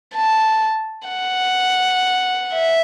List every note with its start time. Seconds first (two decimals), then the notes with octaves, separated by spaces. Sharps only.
0.15 A5
1.09 F#5
2.53 E5